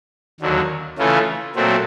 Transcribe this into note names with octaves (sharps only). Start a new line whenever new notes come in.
D#2 D3 F#3
C#3 E3 A3 C#4 F4
A#2 F#3 A3 C4